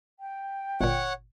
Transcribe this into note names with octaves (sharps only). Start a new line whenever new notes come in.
G5
G1 A#2 C#5 F#5